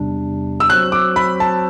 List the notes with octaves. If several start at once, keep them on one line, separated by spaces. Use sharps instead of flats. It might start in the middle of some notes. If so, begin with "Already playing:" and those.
Already playing: E2 C3 G3 D4
E6
F#3 C4 F#4 C5 F#6
D6
B5
A5